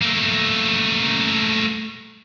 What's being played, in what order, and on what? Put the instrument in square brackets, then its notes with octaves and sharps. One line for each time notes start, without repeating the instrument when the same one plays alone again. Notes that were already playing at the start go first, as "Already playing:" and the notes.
[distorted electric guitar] A3 A#3